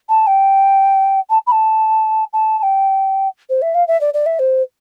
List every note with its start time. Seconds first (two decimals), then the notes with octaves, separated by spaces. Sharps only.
0.09 A5
0.27 G5
1.30 A5
1.47 B5
1.52 A5
2.33 A5
2.59 A5
2.63 G5
3.50 C5
3.62 E5
3.75 F5
3.88 E5
4.01 D5
4.14 D5
4.26 E5
4.39 C5